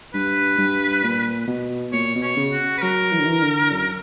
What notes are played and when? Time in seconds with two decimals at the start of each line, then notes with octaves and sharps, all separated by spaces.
0.14 G2 B4
0.59 G2
1.03 A#2
1.48 B2
1.93 A#2 C#5
2.15 B2
2.22 C#5
2.37 C#3
2.52 F#4
2.78 B4
2.82 F#3 A#4
3.12 E3
3.19 D3
3.26 E3
3.42 D3
3.72 F#2